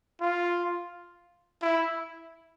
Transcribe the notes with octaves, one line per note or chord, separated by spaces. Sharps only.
F4
E4